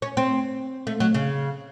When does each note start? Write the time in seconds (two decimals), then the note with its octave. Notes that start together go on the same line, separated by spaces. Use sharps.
0.02 C#4
0.17 C4
0.87 A3
1.00 F#3
1.14 C#3